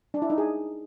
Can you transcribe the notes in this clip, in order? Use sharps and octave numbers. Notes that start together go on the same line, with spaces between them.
D4
E4
D#4
G#4